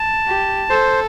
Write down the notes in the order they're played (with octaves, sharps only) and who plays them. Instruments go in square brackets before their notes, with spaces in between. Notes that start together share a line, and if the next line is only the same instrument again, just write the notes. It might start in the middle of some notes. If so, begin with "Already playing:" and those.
Already playing: [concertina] A5
[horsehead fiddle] G4
[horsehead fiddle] A4 [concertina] C5